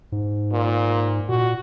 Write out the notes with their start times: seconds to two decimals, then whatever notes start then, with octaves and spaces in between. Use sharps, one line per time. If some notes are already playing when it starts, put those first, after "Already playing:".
0.12 G#2
0.52 A#2
1.29 A#2 F#4